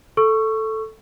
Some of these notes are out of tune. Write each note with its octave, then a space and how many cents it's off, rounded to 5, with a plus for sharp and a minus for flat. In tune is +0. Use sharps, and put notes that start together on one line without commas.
A4 +0 C#6 +0 E6 +30